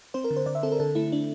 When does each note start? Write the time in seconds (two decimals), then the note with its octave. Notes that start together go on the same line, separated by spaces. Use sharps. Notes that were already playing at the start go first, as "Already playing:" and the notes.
0.14 C4 C5
0.24 A#4
0.30 D3
0.36 C5
0.46 D3 D5
0.55 E5
0.63 C4 A4
0.72 A#4
0.80 D3 A4
0.95 A3 E4
1.12 D4